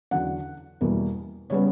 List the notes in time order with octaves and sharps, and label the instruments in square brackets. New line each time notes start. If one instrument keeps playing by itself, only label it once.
[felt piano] E2 D3 F#3 F#5
E2 B2 G3 A#3
C#3 G3 B3 C#5